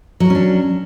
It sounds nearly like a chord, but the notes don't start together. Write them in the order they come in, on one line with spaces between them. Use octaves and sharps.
F#3 A#4 C#4 D4